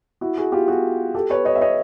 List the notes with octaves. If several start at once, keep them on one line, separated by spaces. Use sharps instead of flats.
E4 F#4
F#4 G#4
F4 G4
F#4 G#4
G4 A4
B4 C#5
C#5 D#5
E5
C#5 D#5